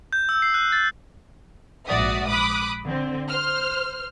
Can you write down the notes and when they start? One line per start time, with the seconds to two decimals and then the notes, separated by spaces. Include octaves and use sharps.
0.13 G6
0.29 E6
0.42 C7
0.54 F#6
0.72 A6
1.86 A#1 G#2 F#4 D5 E5 D#6
2.28 B5 D6 D#6 F#6
2.84 D3 C4
3.29 C5 F6